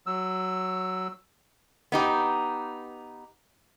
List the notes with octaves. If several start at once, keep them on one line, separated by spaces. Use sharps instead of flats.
F#3 E6
B3 D#4 G4